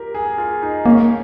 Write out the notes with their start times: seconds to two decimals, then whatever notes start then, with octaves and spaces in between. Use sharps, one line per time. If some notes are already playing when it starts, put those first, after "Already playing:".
Already playing: F4 G4 A#4
0.15 G#4
0.38 F4
0.62 D#4
0.86 A#3 C#4